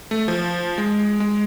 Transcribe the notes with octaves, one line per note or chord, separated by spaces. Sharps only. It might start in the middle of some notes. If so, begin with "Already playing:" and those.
A3
F3
G#3
G#3